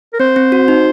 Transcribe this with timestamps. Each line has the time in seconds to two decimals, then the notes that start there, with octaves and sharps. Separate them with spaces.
0.13 A#4
0.20 C4 C5
0.36 C4
0.52 F#4
0.68 D#4